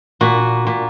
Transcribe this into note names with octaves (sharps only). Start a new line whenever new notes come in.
A#2 F#4
A#2